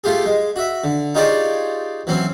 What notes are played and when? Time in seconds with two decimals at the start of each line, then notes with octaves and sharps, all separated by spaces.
0.04 A3 F4 G4 G#4
0.26 G#3
0.56 F#4 E5
0.84 D3
1.15 D#4 F4 G4 G#4 C#5 D5
2.07 E3 F#3 C4 C#4